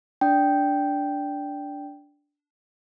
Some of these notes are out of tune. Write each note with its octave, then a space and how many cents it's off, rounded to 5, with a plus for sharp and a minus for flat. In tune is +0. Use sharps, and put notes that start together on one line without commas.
D4 -10 G5 +0